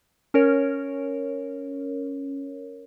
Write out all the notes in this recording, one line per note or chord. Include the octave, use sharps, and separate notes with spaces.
C#4 A#4 C#5